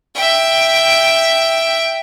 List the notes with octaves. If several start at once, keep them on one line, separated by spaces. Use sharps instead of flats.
E5 G5